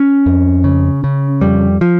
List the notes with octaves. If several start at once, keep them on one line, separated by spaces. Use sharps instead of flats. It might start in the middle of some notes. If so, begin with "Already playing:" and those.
Already playing: C#4
F2
C#3
C#3
F2 G3
F3